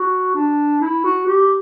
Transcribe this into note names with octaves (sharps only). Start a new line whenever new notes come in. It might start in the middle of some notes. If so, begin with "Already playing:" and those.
Already playing: F#4
D4
E4
F#4
G4